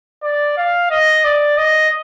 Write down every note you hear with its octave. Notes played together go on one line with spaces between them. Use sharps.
D5
F5
D#5
D5
D#5